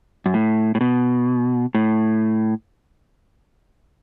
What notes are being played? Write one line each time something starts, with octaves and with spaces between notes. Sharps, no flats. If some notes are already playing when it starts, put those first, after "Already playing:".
F#2
A2
A2
B2
A2